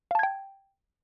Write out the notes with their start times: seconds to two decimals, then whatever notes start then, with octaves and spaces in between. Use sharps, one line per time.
0.11 F5
0.15 A5
0.19 G#6
0.23 G5